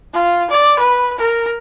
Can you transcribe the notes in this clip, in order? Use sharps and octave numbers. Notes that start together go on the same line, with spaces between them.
F4
D5
B4
A#4